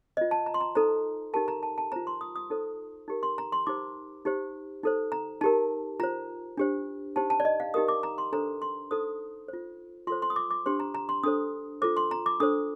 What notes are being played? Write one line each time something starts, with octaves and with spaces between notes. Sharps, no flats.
F4 C5 D#5
A5
A#5
C6
A#5
D#4 A4 C5 A#5
D#4 G4 A#4 A5
A#5
A5
A5
F4 C5 A#5
C6
D#6
D#6
D#4 A4 C5
D#4 G4 A#4
C6
A#5
C6
D#4 G4 C5 D6
D#4 G4 C5
D#4 A4 C5
A#5
D#4 G4 A#4 A5
F4 C5 A#5
D4 G4 C5
D#4 G4 C5 A5
A5
D5
D#5
F5
D#4 G4 A#4 D#6
D6
A#5
C6
D4 A4 C5 A#5
C6
D#4 A4 C5 D#6
F4 C5
F4 A4 C5 C6
C6
D#6
D6
D6
D4 G4 C5 C6
A#5
A#5
C6
D4 A4 C5 D#6
F4 A4 C5 D6
C6
A#5
D6
D4 A4 C5 D#6